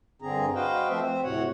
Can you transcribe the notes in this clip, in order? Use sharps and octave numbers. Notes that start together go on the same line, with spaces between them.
G2 D3 C4 G#4 A#5
F#4 B4 C5 D#5 F5 G5
F3 A3 C4 C5 E5
C4 C5
D2 A2 C3 F#4 C#5 F#5